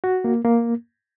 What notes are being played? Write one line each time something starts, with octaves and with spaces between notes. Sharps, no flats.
F#4
A#3
A#3